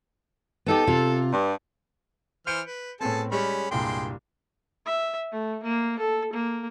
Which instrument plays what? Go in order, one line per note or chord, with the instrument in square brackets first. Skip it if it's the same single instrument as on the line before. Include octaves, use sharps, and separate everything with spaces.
[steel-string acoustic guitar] B3 D#4 G4 [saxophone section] A4
[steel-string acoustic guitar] C3 F4
[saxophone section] G2
[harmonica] E3 C5 F6 [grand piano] G6 C#7 D7
[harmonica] B4
[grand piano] A2 B3 C4 [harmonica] G#4 A4 A5
[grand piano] G3 G#3 [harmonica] C#4 C#5 B5
[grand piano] C2 G2 A#2 [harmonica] G#3 G5 C6
[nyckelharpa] E5
A3
A#3
A4
A#3